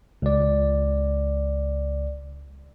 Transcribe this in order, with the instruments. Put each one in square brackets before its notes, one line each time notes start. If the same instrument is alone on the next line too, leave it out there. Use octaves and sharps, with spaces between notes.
[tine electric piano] C#2 D5